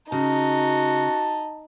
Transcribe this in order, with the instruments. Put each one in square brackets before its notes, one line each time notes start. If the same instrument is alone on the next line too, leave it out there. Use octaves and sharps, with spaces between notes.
[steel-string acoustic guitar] C#3 [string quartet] D#4 [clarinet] F#4 [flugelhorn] A5